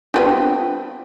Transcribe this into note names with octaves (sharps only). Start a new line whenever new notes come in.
G3 B3 C4 D4 F4